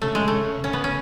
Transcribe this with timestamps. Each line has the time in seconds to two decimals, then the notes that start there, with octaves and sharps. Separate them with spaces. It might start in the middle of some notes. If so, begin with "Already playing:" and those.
0.02 C#3 A3
0.15 G#3
0.28 A3
0.33 C#3
0.64 C#3 C#4
0.73 B3
0.84 C#4